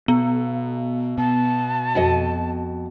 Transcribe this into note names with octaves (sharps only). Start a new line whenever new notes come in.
B2 B3
B2 A5
F2 F#4 D#5